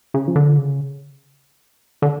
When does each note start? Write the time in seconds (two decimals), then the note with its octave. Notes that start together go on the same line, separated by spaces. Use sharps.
0.14 C#3
0.28 F3
0.36 D3
0.58 C#3
2.02 D3